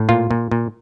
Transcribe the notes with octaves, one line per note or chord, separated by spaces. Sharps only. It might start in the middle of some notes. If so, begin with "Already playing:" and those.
Already playing: A2
A#2 F4
A#2
A#2